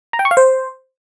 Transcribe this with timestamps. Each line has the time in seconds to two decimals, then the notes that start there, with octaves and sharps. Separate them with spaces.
0.13 A#5
0.19 G5
0.25 C#6
0.31 F5
0.37 C5